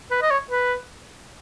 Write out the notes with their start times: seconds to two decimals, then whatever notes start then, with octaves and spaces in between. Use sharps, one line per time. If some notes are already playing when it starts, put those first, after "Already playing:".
0.11 B4
0.22 D#5
0.31 C#5
0.51 B4